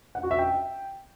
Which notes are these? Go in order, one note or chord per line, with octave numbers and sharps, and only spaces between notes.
F#5
F#4
E5
G5